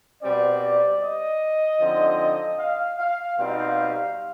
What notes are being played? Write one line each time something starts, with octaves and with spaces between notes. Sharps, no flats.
B2 G3 C4 D5
D5
D#5
D3 F3 C4 D#4
F5
F5
B2 G3 C4 D#4 F5